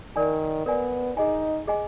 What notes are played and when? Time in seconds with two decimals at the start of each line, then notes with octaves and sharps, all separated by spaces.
0.16 D#3 A#4 D5 G#5
0.66 B3 A#4 D5 G#5
1.17 D#4 G#4 D#5 G#5
1.68 G#4 D#5 G#5